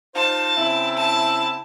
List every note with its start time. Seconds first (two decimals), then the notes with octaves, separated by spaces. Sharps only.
0.15 D#4 F4 C5 A5
0.58 C#3 C4 E4
0.96 A5